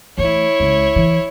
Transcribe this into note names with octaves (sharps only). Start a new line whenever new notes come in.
E3 A3 E4 C#5
C#2
E3